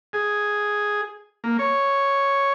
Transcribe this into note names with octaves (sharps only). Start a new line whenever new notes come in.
G#4
A#3
C#5